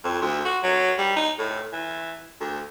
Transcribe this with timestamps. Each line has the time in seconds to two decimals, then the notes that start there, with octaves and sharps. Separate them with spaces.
0.04 F2
0.22 D2
0.45 F#4
0.63 F#3
0.98 G3
1.16 D#4
1.39 A2
1.73 E3
2.41 D2